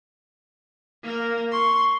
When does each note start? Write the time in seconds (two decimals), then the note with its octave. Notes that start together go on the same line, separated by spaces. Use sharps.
1.04 A#3 A#4
1.52 C6 C#6